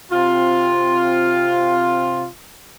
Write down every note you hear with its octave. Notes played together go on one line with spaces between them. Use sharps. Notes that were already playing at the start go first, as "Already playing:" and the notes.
C3 C4 F4